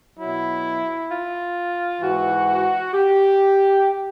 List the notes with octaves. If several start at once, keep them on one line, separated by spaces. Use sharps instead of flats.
B2 F#3 E4
F4
G#2 E3 F#4
G4